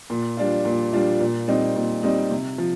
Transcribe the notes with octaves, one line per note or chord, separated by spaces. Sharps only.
A#2
G3 D4 F4
A#2
G3 D4 F4
A#2
G3 C4 D#4
A#2
G3 C4 D#4
C3
F3